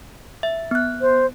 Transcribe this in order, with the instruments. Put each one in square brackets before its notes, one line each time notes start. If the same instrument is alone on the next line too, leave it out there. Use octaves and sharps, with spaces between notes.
[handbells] E5
B3 F#6
[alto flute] C5